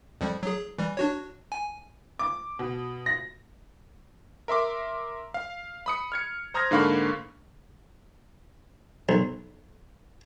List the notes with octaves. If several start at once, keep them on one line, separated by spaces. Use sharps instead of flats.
F2 F3 G3
F#3 G#4
E3 G3
D4 F#4 C#5
G#5
D6
B2
A#6
A#4 E5 C6 D6
F5
B5 D#6 C#7
F6 G#6 C#7
C5 A#5 D#6 F6 G#6 A#6
G#2 D3 A#3 F5 B5 C#6
B1